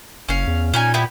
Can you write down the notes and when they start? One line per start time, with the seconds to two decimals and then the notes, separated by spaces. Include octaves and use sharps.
0.29 F#1 C#4 F5
0.47 E2
0.74 A#2 C#4 D#4 G#5
0.94 B3 E4 G4